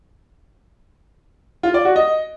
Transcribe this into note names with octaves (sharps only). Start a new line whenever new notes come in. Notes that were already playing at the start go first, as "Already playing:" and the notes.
F4
D5
F#4
D#5